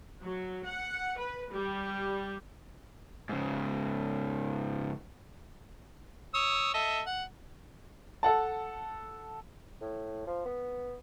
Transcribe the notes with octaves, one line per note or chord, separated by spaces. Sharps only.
F#3
F#5
B4
G3
G#2 C#3
C#5 D#6 E6
A4 D#5 E5
F#5
A4 F#5 A5
A2
F3
B3